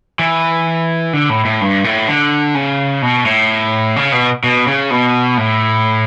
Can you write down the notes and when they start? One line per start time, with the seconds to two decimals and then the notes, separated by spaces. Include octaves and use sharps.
0.19 E3
1.13 D3
1.29 A2
1.45 A2
1.61 G2
1.84 A2
2.08 D3
2.55 C#3
3.02 B2
3.26 A2
3.96 C#3
4.12 B2
4.44 B2
4.67 C#3
4.91 B2
5.38 A2